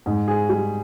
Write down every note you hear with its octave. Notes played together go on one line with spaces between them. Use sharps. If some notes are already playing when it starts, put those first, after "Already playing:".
G#2
G#4
G3